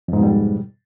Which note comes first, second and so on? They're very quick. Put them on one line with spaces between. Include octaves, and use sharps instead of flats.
F2 G#2 B2 G3